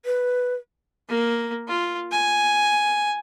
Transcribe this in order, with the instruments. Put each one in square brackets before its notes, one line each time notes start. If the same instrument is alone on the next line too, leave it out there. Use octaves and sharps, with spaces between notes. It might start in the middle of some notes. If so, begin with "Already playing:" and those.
[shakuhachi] B4
[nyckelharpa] A#3
F4
G#5